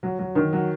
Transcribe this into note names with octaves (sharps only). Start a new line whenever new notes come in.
F#3
F#3
D#3
F#3